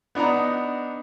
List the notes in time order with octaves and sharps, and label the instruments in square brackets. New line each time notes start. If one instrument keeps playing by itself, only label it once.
[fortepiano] B3 D4 D#4 F#5 A#5